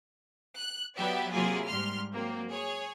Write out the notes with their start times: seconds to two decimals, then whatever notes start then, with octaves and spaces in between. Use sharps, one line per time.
0.57 F#6
0.97 F#3 B3 G4 D5 E5
1.33 C3 F#3 A#3 E4 F4 G#4
1.68 G#2 G3 C6 F6
2.13 F#3 A#3 C4
2.50 G#4 C#5